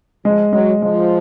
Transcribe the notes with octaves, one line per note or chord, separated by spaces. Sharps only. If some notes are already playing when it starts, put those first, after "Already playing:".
F3 G#3
F#3 G#3
F3 G#3